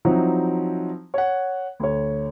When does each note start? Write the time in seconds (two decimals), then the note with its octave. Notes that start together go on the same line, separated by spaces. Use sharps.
0.05 F3 F#3 C4 D#4 E4 F#4
1.14 C#5 F#5
1.80 D2 C#5